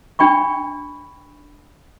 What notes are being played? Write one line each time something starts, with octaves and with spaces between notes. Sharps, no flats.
D4 G5 B5 C#6